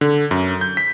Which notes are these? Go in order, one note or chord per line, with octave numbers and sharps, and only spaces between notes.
D3
F#2
G6
B6